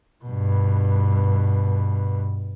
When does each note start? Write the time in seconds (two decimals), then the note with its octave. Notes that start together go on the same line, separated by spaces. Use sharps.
0.24 G2 B2